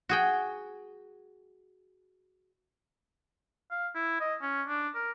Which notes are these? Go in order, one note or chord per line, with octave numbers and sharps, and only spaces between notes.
F#4 G#4 G5
F5
E4
D#5
C#4
D4
A#4